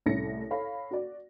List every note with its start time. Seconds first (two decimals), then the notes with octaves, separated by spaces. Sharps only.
0.06 C2 A2 C#4 A#6 C#7
0.50 A4 C#5 F5 B5
0.91 F#4 D5